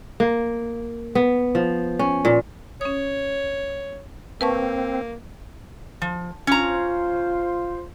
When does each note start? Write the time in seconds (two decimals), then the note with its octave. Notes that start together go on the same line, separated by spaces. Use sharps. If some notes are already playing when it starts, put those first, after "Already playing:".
0.20 A#3
1.15 B3
1.55 F3
1.99 C#4
2.25 A#2
2.81 C#4 C#5 D#6
4.41 A#3 C4 B4 A5 C#6
6.02 F3
6.47 C#4 F4 C5 A#5